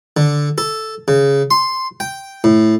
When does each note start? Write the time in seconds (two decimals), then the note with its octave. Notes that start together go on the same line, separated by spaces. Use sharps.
0.17 D3
0.58 A4
1.08 C#3
1.51 C6
2.00 G5
2.44 A2